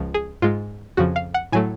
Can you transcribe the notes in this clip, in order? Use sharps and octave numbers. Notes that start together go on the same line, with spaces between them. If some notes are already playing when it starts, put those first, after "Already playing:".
Already playing: C#2 C#3 F3
G#4
G#2 G#3 F4
F2 C#3 F3 F#4
F5
F#5
A2 F#3 A3 G#5